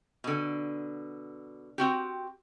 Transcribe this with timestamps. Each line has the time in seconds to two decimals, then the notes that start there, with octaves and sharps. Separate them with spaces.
0.24 B2 D3
1.78 C4 F#4 G4